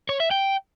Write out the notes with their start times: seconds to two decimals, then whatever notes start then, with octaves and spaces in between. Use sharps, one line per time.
0.09 C#5
0.20 E5
0.31 G5